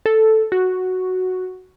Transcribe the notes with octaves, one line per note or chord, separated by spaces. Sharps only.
A4
F#4